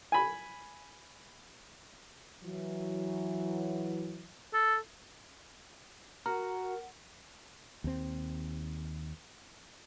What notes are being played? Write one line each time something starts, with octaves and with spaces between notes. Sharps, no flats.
G#5 B5
E3 F#3
A4
F#4 A#4
D#2 C4